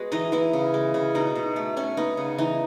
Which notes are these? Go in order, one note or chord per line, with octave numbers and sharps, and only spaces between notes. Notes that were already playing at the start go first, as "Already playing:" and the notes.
Already playing: G#3 B3 F#4
E3 D#4 D#5
E3 B3 E4
C#3
G#3
C#3
B2 D#4
B2
A3
A3 C#4
B3 D#4
C#3
E3 D#4